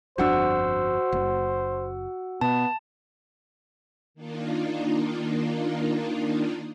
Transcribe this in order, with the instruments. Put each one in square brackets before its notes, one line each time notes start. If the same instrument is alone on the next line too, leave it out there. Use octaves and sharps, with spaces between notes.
[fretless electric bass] G1 F2 D4 [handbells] F#4 F#5 E6 [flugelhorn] C5
[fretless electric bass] F#1
[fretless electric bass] B2 [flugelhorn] B3 [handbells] A5
[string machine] D#3 A#3 D4 D#4 F4